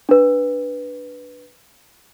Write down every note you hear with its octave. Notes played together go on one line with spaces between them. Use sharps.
D4 B4